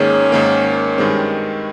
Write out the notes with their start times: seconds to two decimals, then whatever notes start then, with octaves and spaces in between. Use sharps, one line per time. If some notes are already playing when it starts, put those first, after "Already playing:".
Already playing: G#2 D#3 A#3 C#4 D#4 G#4
0.32 G#2 D#3 A#3
0.98 G2 D#3 G#3 C4